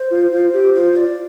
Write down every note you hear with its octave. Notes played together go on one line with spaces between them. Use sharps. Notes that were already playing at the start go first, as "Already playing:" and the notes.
Already playing: C5
F4
F4
G4
F4 C5
D5